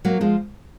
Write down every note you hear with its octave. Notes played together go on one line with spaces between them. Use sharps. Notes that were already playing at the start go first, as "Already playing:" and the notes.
F#3 A#3
F3 G#3